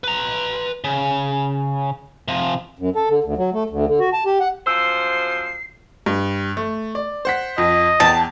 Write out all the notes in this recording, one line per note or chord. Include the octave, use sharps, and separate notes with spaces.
B4 A#5
C#3
C3 F3
F#2
A4
D3
D2
F#3
A3
D2
D3
F#4
A5
G4
F#5
F#2 F3 C5 E6 C7
G2
A3
D5
C5 F#5 B6
F2 D#5
E2 B3 G5 A5